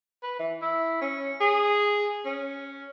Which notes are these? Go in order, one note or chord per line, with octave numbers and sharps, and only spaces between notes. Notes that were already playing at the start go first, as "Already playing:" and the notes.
B4
E3
E4
C#4
G#4
C#4